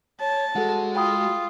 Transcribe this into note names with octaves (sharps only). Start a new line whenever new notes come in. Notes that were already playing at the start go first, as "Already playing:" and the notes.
C#5 A5
G#3 F#4 A4 F#5
F4 G5 B5 D#6